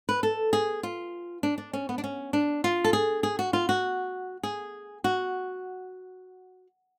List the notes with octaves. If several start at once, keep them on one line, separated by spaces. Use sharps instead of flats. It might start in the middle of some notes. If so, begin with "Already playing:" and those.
B4
A4
G#4
F4
D4
D4
C#4
B3
D4
C#4
D4
F4
A4
G#4
G#4
F#4
F4
F#4
G#4
F#4